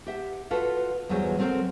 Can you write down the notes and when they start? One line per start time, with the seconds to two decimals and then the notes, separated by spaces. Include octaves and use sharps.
0.07 G4 E5 F#5
0.51 F4 F#4 A4 B4 F#5
1.09 E2 F#3 G3 G#4 C5 C#5
1.39 F#3 C4 A4 A#4 C5